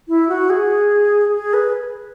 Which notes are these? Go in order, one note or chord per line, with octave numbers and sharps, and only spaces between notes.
E4
F#4
G#4
G#4
B4